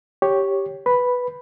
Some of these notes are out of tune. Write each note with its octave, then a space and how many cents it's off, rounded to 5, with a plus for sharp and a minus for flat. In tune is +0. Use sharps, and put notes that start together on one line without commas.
G4 +0 C#5 +0
B4 +0 B5 +0